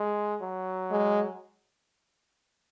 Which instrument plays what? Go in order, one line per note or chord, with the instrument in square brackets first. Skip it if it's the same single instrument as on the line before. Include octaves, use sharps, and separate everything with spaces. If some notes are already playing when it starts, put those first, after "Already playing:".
Already playing: [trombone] G#3
F#3
[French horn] G#3